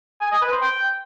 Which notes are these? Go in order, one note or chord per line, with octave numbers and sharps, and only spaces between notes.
G#5
D#5
B4
C5
G5